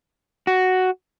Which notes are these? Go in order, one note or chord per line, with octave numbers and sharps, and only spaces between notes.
F#4